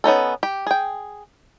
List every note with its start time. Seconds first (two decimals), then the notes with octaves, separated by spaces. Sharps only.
0.04 B3 C#4 D#4 A4
0.43 G4
0.66 G#4 G5